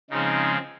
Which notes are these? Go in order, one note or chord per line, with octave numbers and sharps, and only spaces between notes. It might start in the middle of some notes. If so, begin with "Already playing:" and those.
C#3 F3 G#3 C4 D#4